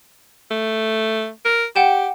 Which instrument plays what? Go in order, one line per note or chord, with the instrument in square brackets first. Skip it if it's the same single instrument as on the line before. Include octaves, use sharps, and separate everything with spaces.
[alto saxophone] A3
A#4
[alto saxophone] G4 [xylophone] F#5 G5 E7